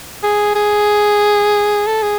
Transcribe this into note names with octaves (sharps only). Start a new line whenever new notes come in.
G#4
G#4
A4
G#4